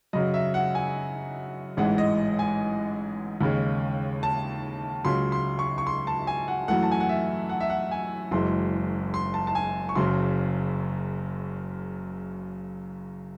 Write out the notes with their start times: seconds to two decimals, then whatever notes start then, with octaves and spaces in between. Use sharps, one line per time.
0.13 F#2 C#3 F#3 D#5
0.34 E5
0.54 F#5
0.75 G#5
1.77 A1 G#2 E3 G#3 F#5
1.98 D#5
2.39 G#5
3.41 D#2 C#3 G#3
4.23 A5
5.04 C#2 C#3 F#3 C6
5.32 C6
5.59 C#6
5.78 C#6
5.87 C6
6.07 A5
6.27 G#5
6.48 F#5
6.68 F#2 E3 A3 F#5
6.83 A5
6.92 G#5
7.00 F#5
7.09 E5
7.49 F#5
7.60 E5
7.70 F#5
7.91 G#5
8.31 F#1 F#2 E3 G#3 C6
9.14 C6
9.34 A5
9.47 A5
9.55 G#5
9.89 C#6
9.95 F#1 F#2 C#3 C6